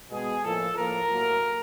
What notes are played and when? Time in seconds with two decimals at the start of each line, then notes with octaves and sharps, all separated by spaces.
0.10 B2 G#3 B3 G#4
0.43 A2 F3 A#3 A4
0.75 A2 F3 A#3 A#4
1.08 A2 F#3 A#3